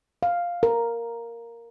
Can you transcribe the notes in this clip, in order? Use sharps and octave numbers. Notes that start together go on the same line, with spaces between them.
F5
A#4